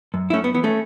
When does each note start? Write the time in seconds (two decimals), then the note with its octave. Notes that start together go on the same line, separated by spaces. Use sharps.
0.14 F#2
0.30 E4
0.33 F#2 A3 C#4
0.44 B3
0.54 E3 B3
0.64 A3 C#4